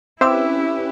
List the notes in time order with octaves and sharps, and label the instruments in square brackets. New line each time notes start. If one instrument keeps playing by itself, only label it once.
[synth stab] C4 [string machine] C#4 G4 B4 [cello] E4 [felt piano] E5 D6 E6